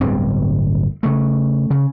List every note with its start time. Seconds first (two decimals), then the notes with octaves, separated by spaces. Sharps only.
0.01 D1 G1 G2 C4
1.03 C#3 A3
1.70 C#3